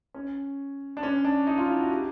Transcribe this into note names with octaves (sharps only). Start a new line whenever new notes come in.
C#4
D4
C#4
D4
D#4
F4
E4
F#4
G4